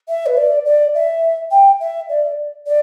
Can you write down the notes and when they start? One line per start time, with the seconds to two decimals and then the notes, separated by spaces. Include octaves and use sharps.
0.08 E5
0.26 B4
0.37 D5
0.66 D5
0.95 E5
1.51 G5
1.81 E5
2.09 D5
2.67 D5